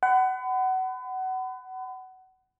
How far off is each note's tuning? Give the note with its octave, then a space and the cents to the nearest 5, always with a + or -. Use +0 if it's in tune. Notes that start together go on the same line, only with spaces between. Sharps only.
F#5 +25 B5 +35